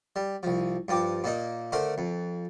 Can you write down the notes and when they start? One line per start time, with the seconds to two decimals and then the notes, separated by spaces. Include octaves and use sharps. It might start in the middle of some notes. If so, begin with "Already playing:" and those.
0.16 G3
0.43 C2 F3
0.88 G2 F3 G5 D6
1.24 A#2 A#3 D#4
1.72 D3 A3 A#4 C5
1.98 F2